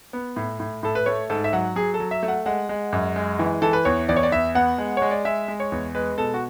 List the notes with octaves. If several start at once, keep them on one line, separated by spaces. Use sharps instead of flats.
B3
A2
A2
A2 A4
B4
A3 C#5
G#2 A4
E5
F#3 F#5
F#3 G#4
A4
F#3
E5
A3
F#5
G#3 F#5
G#3
F#2
G#3
E3
E3 A4
B4
E2 C#5
E2 D5
C#5
D5
E2 E5
B3 F#5
G#3
G#3 C#5
D5
G#3 E5
G#3
C#5
E2
G#3 B4
B2 A4
F#4